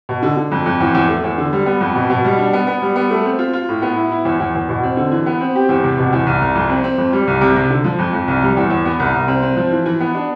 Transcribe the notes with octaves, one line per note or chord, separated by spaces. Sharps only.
B2
D3
D3
F2
F2
E2
E2
A3
E2
D3
G3
B3
F2
B2
B2
G3
D4
B3
B3
G3
B3
A3
C4
F4
F4
A2
B3
E4
E4
E2
E2
E2
B2
C4
D3
E3
B3
C4
G4
E2
C3
B2
E2
C2
C2
F2
C4
C4
F2
G3
C2
C3
C3
D3
F3
F2
F2
C2
G3
E2
E2
B3
C2
C2
C4
C4
F3
E3
E3
B3
D4